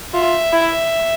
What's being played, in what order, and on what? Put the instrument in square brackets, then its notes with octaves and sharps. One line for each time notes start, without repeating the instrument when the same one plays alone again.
[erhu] F4 [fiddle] E5
[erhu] E4